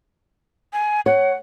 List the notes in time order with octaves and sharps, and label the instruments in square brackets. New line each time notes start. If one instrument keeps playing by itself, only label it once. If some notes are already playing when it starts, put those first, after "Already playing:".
[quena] G#5
[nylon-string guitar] C#5 [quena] F#5